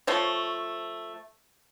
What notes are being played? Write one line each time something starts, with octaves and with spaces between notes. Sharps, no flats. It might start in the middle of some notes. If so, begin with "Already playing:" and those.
F3 A3 C#5